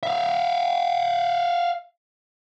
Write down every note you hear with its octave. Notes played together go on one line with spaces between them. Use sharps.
E5 F5